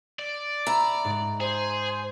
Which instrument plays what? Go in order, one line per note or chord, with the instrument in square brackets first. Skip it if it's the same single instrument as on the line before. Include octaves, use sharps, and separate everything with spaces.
[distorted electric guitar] D5
[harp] E5 B5 [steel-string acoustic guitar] A#5
[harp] G#2
[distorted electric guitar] G#4 [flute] C5